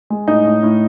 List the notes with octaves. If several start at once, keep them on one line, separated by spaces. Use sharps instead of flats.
G#3
A2 D#4
A2
A2